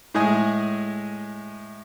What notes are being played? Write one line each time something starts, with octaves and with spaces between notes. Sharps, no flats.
A2 G#3 G#4